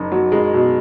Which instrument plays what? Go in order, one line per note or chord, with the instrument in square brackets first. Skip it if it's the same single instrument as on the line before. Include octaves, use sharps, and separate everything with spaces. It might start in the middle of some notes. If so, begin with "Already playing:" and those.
Already playing: [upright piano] F#1 [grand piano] D#4
[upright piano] F#3
[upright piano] F#1 [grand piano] G#3
[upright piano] B2